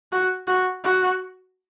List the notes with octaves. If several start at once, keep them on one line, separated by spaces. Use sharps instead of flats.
F#4
F#4
F#4